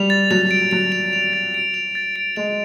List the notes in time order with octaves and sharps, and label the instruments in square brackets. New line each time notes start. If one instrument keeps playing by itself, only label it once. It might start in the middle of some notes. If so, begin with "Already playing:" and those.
Already playing: [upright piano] G3 [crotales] F7
[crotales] A6
[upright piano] F#3 [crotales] F7
[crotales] D7
[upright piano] F#3 [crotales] D7
[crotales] F7
F7
A6
D7
F7
A6
D7
[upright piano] G#3 [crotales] F7